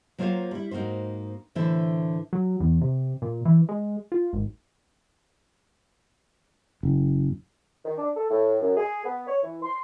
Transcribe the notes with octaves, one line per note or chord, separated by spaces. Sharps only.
F#3 A#3 F4 C5 C#5 F5
G3 E4
G#2 A#3 D#4 F#4 C5
A2 D3 E3 E4 C5 E5
F#3
E2
C3
A#2
E3
G#3
F4
G#1
F#1
D#3
D4
A4
A2
F#2
G#4
B3
C#5
E3
C6